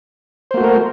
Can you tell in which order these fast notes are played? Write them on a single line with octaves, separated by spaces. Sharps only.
C5 A#3 F#4 A3 A#4